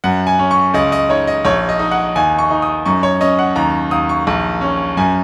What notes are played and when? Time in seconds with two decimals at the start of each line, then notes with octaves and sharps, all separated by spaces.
0.04 F#2 F#5
0.27 G#5
0.39 C#4
0.51 C#6
0.74 C#2 D#5
0.92 D#5
1.09 D#4 C#5
1.27 D#5
1.45 A#1 C#5
1.69 D#5
1.79 D#4
1.91 F#5
2.15 D#2 G#5
2.38 C#6
2.50 D#4
2.62 D#6
2.86 F#2 C#6
3.03 C#5
3.21 C#4 D#5
3.39 F#5
3.56 D#2 A#5
3.91 D#2 D#6
4.09 C#6
4.27 A#1
4.61 C#4
4.97 F#2 G#5